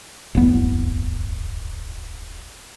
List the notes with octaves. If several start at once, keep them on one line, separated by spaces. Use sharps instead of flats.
D1 G1 E2 B3